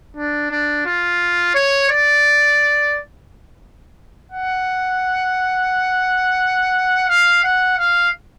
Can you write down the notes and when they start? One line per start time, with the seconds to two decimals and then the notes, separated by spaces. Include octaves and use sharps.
0.17 D4
0.51 D4
0.86 F4
1.55 C#5
1.90 D5
4.32 F#5
7.09 F5
7.44 F#5
7.78 F5